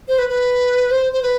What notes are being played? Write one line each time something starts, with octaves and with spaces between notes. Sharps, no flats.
C5
B4
B4
C5
C5
B4